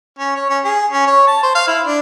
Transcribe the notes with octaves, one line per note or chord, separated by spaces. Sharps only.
C#4
C#5
C#4
G#4
C#4
C#5
A5
C5
F5
E4
D4